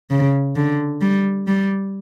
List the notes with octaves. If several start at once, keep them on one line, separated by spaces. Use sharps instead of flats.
C#3
D3
G3
G3